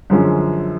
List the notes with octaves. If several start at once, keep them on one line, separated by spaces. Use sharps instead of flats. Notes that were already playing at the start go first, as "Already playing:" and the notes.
F#2 D3 F3 G#3 C#4